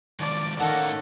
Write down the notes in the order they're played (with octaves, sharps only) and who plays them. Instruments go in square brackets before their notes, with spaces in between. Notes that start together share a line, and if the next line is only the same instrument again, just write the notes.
[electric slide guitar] D#3 F3 G#3 [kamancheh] D5 A5
[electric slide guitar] A2 A#4 F5 [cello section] D#3 C#4 [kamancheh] A4 [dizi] F#5